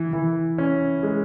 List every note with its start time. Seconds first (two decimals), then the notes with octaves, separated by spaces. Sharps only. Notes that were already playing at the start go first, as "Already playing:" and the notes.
Already playing: E3
0.13 E3
0.58 C#4
1.03 G#3